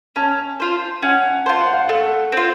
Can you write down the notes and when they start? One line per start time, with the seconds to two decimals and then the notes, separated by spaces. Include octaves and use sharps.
0.16 C#4 A5
0.60 F4 C5
1.02 C#4 F#5
1.46 F4 C5 A5
1.60 F#5
1.73 F5
1.88 A3 F#5
2.32 C4 F4